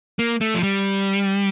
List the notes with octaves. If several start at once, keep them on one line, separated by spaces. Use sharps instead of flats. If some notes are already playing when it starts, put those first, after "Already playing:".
A#3
A3
F3
G3